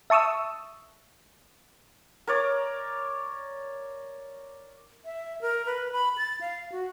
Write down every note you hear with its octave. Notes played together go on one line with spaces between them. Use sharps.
E5 A5 C#6 D#6 E6
A#4 C#5 D5
E5
A#4
B4
B5
A6
F5
F#4